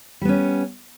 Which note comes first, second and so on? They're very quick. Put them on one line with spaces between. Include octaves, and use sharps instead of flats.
G3 B3 C#4